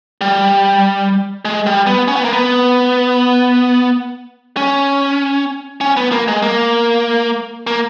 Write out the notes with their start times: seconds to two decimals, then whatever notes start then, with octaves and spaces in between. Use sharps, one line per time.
0.21 G3
1.45 G#3
1.66 G3
1.87 B3
2.08 C#4
2.16 B3
2.25 A#3
2.33 B3
4.57 C#4
5.81 C#4
5.97 B3
6.12 A#3
6.28 G#3
6.42 A#3
7.67 A#3